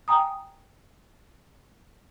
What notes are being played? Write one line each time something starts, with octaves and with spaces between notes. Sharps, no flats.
G5 G#5 A#5 D#6